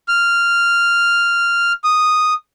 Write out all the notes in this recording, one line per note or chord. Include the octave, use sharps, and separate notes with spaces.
F6
D#6